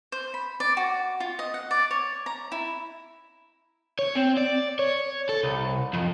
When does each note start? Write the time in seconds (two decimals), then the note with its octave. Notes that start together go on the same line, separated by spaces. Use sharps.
0.12 C5
0.34 B5
0.60 D5
0.77 F#4
1.20 F4
1.39 D#5
1.54 F#5
1.71 D5
1.91 C#5
2.26 A#5
2.52 E4
3.99 C#5
4.15 C4
4.37 D5
4.79 C#5
5.29 A4
5.43 C2
5.94 F2